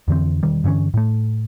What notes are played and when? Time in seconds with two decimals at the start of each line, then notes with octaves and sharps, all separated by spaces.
0.08 F2 D3 E3 C4
0.43 E1 D#3 G3
0.64 G2 D3 E3 C#4
0.94 A2 A3